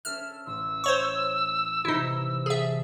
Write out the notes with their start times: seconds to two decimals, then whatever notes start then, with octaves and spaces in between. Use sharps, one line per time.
0.05 C#4 A4 E5 F6
0.46 A1 C6 E6
0.84 C5 C#5 C#6
1.85 C3 E3 D#4 E4
2.46 G#4 A4 D5 E5 A6